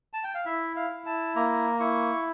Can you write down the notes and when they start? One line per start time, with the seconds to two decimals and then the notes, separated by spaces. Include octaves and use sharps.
0.13 A5
0.24 G5
0.34 F5
0.46 E4 E5
0.76 F5
0.90 E4
1.06 A5
1.35 A#3 A#5
1.80 E4 C#6